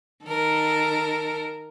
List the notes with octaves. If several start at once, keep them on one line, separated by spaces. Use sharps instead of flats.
D#3 A4 A#4